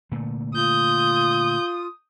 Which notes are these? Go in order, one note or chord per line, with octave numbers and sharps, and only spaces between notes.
A#2 D3 A3
F4 D#6 G6